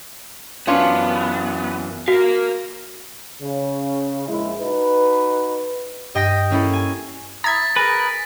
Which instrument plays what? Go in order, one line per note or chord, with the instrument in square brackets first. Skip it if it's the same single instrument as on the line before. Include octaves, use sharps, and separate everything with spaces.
[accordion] F#2 E3 [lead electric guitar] B3 [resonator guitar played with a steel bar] C#4 D4 F4
[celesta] F#4 [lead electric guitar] A#4 F5
[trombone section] C#3
A#1 G#3 E4
D#4 F#4 B4
[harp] G2 D#5 G5 D#6 A#6 B6
A#3 C#4 E4 A4
G#5
[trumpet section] E4 D#6 [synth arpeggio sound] A#5 G#6 [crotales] A6 B6
[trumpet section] G#4 [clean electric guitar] A#4 B4